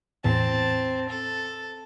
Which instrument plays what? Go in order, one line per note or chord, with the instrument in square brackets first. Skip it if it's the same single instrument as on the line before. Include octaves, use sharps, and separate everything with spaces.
[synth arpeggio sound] E2 A2 E3 [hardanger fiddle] C4 A5
[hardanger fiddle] A4